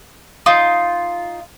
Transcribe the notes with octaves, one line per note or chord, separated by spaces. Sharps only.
D#4 F4